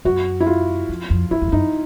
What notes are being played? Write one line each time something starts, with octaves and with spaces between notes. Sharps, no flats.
F#2 F#4
E4
F4
F2
F2
F2 E4
F2
G2
F#2 D#4